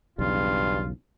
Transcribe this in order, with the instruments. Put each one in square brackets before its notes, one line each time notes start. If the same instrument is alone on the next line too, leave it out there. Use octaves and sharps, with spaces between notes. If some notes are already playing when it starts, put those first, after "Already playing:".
[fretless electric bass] B1 E2 C#3 [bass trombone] G2 [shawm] F4